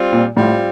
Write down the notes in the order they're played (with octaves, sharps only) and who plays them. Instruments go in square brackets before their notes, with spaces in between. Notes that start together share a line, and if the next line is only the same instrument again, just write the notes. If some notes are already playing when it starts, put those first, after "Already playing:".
Already playing: [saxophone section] G3 C4 F4
[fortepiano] A#2
[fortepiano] A2 [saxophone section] G3 C4 F4